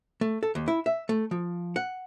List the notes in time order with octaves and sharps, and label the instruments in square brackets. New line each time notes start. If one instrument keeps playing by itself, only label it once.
[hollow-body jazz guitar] A3
A4
D#2
E4
E5
A3
F3
F#5